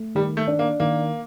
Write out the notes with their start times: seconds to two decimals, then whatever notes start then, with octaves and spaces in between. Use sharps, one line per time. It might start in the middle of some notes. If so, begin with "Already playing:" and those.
Already playing: A3
0.15 D#3 G3
0.37 A3
0.48 D4
0.59 A#3
0.80 D#3 A#3